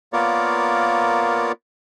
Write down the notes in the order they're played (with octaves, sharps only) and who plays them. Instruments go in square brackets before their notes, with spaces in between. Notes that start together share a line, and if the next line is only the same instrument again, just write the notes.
[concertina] A#3 B3 F4 A#4 C#5 D5